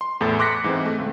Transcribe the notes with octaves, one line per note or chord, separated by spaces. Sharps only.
C6
E2 A2 A4 A6
C6 D6 F#6 A#6 B6 C#7
G#2 E3 G#3 C4
A3
C#2 A3